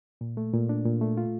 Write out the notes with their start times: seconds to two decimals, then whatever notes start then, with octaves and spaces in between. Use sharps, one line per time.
0.21 A#2
0.37 A3
0.53 A#2
0.69 D4
0.86 A#2
1.01 A3
1.17 F4